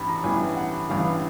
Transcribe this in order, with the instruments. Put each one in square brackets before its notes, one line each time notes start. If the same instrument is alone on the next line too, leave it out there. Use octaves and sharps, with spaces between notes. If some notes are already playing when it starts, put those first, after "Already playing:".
Already playing: [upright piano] A1 G2 E3 G3 B5
A#5
A1 G2 E3 G3 G#5
F#5
A1 G2 E3 G3 F5